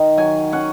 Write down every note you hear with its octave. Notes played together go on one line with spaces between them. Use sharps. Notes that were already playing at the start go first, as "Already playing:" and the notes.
Already playing: D#3 D#4
F#3 G#5
C#4 F#5